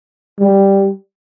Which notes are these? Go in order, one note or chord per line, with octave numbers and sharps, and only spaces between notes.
G3